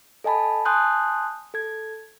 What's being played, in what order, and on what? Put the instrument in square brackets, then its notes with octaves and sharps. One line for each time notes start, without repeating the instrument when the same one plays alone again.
[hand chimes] A4 D#5 G#5 A5 B5
G#5 A5 C6 D#6 F#6 G6
A4 G#6